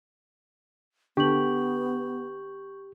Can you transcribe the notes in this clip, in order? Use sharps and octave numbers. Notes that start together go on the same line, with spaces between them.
D3 B3 D4 G4 C#6 G6 F#7